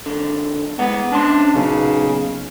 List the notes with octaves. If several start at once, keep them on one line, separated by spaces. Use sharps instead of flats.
B1 D3
G#3 B3 F#5
B2 C#4 D4 C6
B1 A#2 C#3